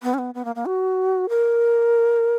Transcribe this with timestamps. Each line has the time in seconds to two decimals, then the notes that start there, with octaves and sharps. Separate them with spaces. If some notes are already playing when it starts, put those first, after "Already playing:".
0.03 B3
0.14 C#4
0.18 B3
0.35 B3
0.45 A#3
0.55 A#3
0.66 F#4
1.29 A#4